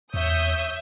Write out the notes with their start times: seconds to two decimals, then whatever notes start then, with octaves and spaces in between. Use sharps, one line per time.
0.14 E2 C#5 E5 D#6 G6